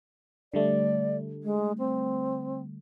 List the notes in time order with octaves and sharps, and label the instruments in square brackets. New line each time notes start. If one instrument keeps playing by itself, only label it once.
[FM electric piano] D3 G3 A3 [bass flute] D5
[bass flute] G#3
C4